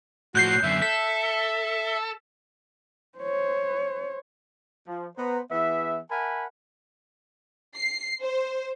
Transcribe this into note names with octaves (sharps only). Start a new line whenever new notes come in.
A2 F3 F#4 F#6 G6 C7
F#2 D3 E5
A4 B6
C5 C#5
F3
B3 C5 A#5
E3 B3 G#4 E5
A#4 E5 F#5 G#5 A5 B5
C7
C5